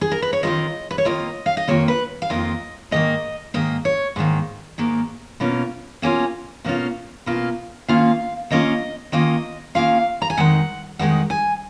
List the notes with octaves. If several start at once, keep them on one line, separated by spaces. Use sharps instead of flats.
G#4
A#4
B4
C#5
F2 D#3 A#3 F4 D#5
B4
C#5
F2 D#3 A#3 F4 D#5
F5
D#5
F2 D#3 A#3 F4 C#5
B4
F5
F2 D#3 A#3 F4 D#5
G#2 D#3 A#3 D#5
G#2 D#3 A#3 D#5
C#5
G#2 D#3 A#3
G#2 D#3 A#3
B2 A#3 C#4 F4
B2 A#3 C#4 F4 G#5
B2 A#3 C#4 F4
B2 A#3 C#4 F4
D#3 A#3 C#4 F4 F5
D#3 A#3 C#4 F4 D#5
D#3 A#3 C#4 F4 D#5
D#3 A#3 C#4 F4 F5
A#5
G#5
F2 D#3 G#3 D#4 F#5
F2 D#3 G#3 D#4 F#5
G#5